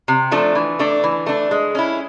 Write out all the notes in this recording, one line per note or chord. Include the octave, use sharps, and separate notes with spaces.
C3
F3 A3 D4
E3
A3 D4
E3
A3 D4
G#3
C#4 E4